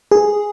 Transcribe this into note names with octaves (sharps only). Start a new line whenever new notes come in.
G#4